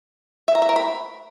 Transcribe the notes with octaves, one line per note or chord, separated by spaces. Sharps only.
E5
A#5
E5
A#4
B5